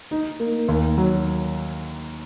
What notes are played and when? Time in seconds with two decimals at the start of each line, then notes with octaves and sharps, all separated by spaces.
0.11 D#4
0.40 A#3
0.68 D#2
0.98 F#3